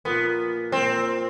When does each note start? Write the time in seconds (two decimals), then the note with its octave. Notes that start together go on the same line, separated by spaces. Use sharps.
0.05 A#2 F3 A#3 B3
0.72 A#2 F3 A#3 C4